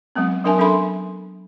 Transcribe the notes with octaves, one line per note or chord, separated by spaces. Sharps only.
F#3 G#3 B3 C4
F#3 D4 A#4 E5 G#5 A5
F#3 C#4 A4 E5 B5 C6